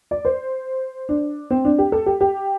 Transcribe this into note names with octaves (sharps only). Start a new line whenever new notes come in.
D5
C5
D4
C4
D4
G4
A4
G4
G4